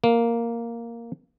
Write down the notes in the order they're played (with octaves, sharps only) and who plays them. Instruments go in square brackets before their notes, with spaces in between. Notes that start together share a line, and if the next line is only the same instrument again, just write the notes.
[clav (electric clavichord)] A#3